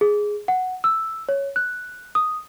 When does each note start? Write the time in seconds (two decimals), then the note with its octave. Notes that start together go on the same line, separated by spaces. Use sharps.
0.01 G#4
0.48 F#5
0.84 E6
1.29 C#5
1.56 F#6
2.15 D#6